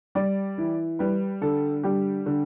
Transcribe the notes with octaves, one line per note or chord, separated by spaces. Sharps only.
G3 D5
E3
G3 B4
D3 A4
G3 G4
D3